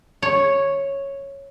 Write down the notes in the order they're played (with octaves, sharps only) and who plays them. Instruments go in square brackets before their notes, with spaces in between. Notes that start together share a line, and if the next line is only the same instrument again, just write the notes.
[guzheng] C#5